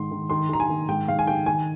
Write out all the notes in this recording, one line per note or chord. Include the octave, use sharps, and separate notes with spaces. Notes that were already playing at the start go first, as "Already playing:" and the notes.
Already playing: G#2 D#3 C6
D#3
D#3 C6
D#3 A#5
G#5
D#3
G#2 G5
G#2 F5
G#5
D#3 G5
D#3 G#5